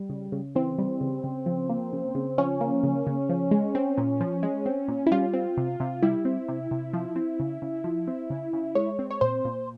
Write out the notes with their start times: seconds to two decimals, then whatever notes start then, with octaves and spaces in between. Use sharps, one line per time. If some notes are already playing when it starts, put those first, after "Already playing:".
Already playing: G3
0.09 C#3
0.32 C#3
0.55 E3 C4
0.78 G3
1.01 C#3
1.24 C#3
1.46 F3
1.69 A#3
1.93 C#3
2.15 C#3
2.38 F3 C#4
2.61 A#3
2.83 C#3
3.07 C#3
3.29 F3
3.51 G#3
3.75 C4
3.98 A#2
4.21 F3
4.43 G#3
4.66 C4
4.88 A#2
5.07 E4
5.12 G3 F4
5.33 C4
5.57 C3
5.80 C3
6.02 G3 E4
6.25 C4
6.48 C3
6.71 C3
6.93 F3
7.16 C4
7.40 C#3
7.62 C#3
7.84 F3
8.07 C4
8.30 C#3
8.53 C#3
8.75 G#3 C#5
8.99 C4
9.11 C#5
9.21 A#2 C5
9.45 A#2